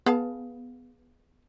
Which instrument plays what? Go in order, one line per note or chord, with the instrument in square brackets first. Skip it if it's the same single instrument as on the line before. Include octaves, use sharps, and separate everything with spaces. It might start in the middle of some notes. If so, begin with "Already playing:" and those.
[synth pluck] B3 [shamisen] G#4 F5 A5